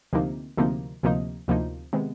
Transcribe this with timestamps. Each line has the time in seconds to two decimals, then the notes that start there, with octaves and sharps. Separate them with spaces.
0.13 D2 C3 F3 A#3 D#4
0.57 D2 C3 F3 A#3 D#4
1.03 D2 C3 F3 A#3 D#4
1.48 D2 C3 F3 A#3 D#4
1.93 C3 D#3 G#3 B3